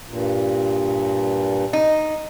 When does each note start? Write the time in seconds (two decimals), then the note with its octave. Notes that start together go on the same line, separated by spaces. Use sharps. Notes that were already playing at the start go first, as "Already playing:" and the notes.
0.07 G2 A#2
1.73 D#4